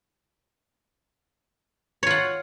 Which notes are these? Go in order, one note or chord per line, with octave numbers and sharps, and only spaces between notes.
F4 C#5 F#5